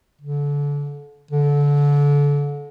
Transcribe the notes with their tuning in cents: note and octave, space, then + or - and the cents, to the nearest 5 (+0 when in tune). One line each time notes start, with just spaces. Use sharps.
D3 -30
D3 -30